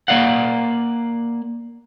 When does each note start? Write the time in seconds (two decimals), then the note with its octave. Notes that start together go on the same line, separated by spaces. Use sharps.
0.08 A#3 D5 F5 F#5